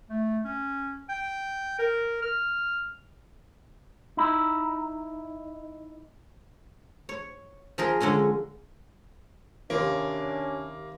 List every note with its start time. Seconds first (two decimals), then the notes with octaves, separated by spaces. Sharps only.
0.10 A3
0.44 C#4
1.09 G5
1.79 A#4
2.22 F6
4.17 D#4 E4
7.09 C#5
7.78 F3 G#4 A#4
8.00 D3 G#3 C#4 G#5
9.70 D#2 C3 A#3 C#4 D4